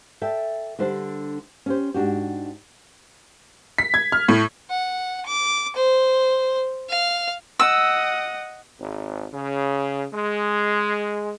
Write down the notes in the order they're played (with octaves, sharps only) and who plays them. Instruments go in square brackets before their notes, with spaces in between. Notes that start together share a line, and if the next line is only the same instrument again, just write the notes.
[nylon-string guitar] A4 D5 E5 G5 A5
D3 G3 D4 C5
C#4 G4 C5
G#2 D4 F#4 G4
[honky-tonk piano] B6
G#6
F6
A2
[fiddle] F#5
D6
C5
F5
[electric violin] D#5 F#5 [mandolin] E6
[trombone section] G#1
C#3
G#3